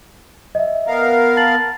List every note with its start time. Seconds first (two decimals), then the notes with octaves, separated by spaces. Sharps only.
0.55 D#5 E5
0.87 B3 A#4 F5
1.37 A5 A6 F#7